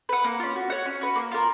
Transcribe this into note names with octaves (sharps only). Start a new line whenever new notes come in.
B4 F#5
A#3
C#4 F4
F#4
C#5 F#5
C#4
F#4 B4
A#3
F4 A#4